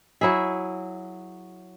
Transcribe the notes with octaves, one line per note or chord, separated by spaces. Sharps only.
F#3 E4 G#4 E5